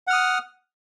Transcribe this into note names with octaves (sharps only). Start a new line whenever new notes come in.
F#5 D#6 F6